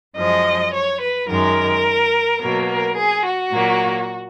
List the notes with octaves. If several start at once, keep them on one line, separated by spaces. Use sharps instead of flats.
F#2 F3 G#3 D#5
C#5
B4
F#2 D#3 G#3 A#4
B2 F#3 A#3 A#4
A#4
G#4
F#4
A#2 F#3 A#3